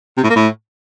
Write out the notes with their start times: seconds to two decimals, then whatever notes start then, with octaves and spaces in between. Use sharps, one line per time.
0.17 C3
0.23 A2
0.29 A#3
0.36 A2